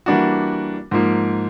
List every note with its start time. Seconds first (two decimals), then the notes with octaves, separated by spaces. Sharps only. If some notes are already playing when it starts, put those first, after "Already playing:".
0.06 E3 G3 A#3 D4 F#4
0.91 G#2 F3 A#3